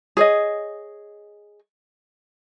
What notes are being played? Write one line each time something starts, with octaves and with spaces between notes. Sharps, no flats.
G#4 C#5 D#5